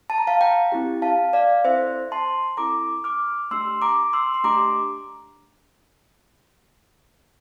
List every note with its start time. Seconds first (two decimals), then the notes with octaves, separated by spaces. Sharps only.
0.10 A5
0.18 A#5
0.27 F5 A5
0.41 G5 A#5
0.72 C4 E4 G4
1.02 F5 A5
1.33 D5 F5
1.65 C4 E4 A4 C5 E5
2.12 A5 C6
2.57 C4 E4 A4 A#5 D6
3.04 D6 F6
3.51 A3 D4 G4 C6 E6
3.82 A#5 D6
4.13 C6 E6
4.34 C6
4.44 A3 D4 G4 A#5 D6